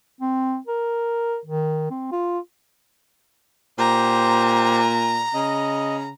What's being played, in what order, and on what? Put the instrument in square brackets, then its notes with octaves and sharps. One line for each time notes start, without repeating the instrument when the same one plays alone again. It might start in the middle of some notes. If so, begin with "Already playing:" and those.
[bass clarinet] C4
A#4
D#3
C4
F4
[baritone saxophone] A#2 [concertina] G4 C5 [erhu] A#5
[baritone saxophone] C#3 [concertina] D#5